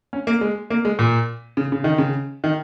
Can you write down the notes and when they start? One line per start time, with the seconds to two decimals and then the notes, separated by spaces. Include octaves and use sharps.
0.13 C#4
0.27 A#3
0.41 G#3
0.70 A#3
0.85 G#3
0.99 A#2
1.57 C#3
1.72 C#3
1.84 D#3
1.98 C#3
2.44 D#3